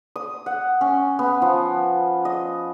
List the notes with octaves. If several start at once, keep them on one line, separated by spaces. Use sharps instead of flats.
D#6
F#5
C#4
B3
F3
D#5